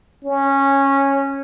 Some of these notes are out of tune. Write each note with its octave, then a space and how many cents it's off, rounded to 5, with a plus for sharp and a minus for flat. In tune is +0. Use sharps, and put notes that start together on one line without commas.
C#4 -10